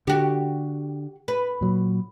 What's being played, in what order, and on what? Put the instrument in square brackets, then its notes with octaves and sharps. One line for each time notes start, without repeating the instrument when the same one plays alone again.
[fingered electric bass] D3 [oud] F#4 G4
[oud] B4
[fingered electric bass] A#2 F#3